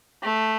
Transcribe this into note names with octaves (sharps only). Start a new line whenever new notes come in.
A3